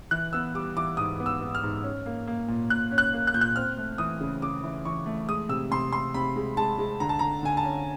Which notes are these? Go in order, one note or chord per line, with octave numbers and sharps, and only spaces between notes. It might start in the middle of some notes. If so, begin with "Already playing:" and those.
E3 F#6
B3 E6
G3 D6
E3 D6
G#2 D#6
B3
E6
B3
F6
G#2
C#4
A#3
A#3
A#2
A#2 F#6
C#4
F#6
A#3
F#6
A#2 G6
F#6
C4 F6
A3
E3 D#6
C#3
C#3 D6
E3
E3 C#6
A3
G#3 D#6
C3 E6
C3 C6
C3 C6
C3 B5
G#3
G#3 A5
G#3
D3 A#5
A5
D3 A#5
D3 G#5
A5
C#4